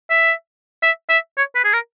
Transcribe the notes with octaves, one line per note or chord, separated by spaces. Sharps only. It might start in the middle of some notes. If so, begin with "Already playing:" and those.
E5
E5
E5
C#5
B4
G#4
A#4